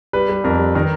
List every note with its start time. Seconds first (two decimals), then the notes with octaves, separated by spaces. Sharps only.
0.13 G3 B4
0.29 G3
0.44 F2 A#4
0.60 G3
0.75 D#3 A#4